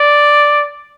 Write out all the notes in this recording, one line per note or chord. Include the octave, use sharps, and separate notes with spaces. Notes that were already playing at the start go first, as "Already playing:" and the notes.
Already playing: D5